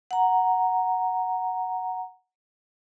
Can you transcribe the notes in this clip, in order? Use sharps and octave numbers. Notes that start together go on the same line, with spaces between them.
F#5 A#5